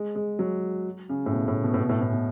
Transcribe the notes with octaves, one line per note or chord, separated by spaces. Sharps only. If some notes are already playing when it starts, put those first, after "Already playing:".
Already playing: G#3
G#3
F#3
C#3
A2
B2
A2
B2
A2
B2
A2
A2
B2